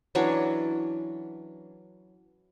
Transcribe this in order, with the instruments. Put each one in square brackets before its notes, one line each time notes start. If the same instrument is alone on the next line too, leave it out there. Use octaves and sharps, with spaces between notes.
[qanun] E3 F#3 C#4 D4